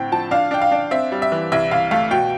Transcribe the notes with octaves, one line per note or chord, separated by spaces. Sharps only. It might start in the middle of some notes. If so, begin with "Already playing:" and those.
Already playing: A2 D3 C4 G5
F3 A5
D4 F5
D4 G5
F5
D4
C4 E5
G3
E5
E3
C2 E5
C2 F5
A3 F5
B2 G5